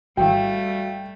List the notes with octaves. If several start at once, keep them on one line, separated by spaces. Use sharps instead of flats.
G#1 E3 G3 A3 F#4 F5 G5